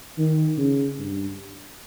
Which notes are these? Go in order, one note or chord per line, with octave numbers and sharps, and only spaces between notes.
D#3
C#3
G2